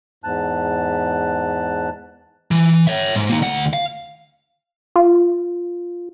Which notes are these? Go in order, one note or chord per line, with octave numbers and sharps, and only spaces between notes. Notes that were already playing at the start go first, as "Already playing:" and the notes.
E2 G#2 A5 F#6
E3
C#5 E5
G#2
A#3 D#4
D2 F#5
F5
F4